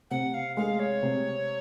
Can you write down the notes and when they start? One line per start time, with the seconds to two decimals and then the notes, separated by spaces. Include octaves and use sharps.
0.11 C3 F#5
0.34 F5
0.56 G#3 F5
0.79 C#5
1.03 C3